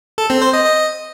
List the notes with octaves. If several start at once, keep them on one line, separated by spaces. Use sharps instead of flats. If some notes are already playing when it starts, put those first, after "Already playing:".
A4
C4
C5
D#5
D#5